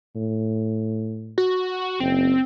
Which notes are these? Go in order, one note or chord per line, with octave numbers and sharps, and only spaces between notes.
A2
F#4
F#1 C4